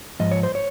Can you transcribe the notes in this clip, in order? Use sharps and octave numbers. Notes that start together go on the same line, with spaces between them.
G#2 F3 D#5
C#5
C5
C#5